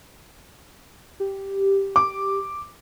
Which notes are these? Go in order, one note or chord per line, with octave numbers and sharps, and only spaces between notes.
G4
D6